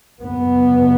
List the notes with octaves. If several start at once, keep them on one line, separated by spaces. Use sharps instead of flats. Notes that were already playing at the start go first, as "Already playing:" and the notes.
F#2 C#3 B3